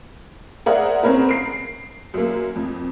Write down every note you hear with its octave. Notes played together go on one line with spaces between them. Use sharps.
G#4 A#4 C5 D5 E5 F#5
C4 C#4 G#4 A#4 B4
C7 D7
F#2 A#3
F2